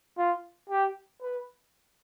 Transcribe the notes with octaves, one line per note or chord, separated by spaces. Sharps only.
F4
G4
B4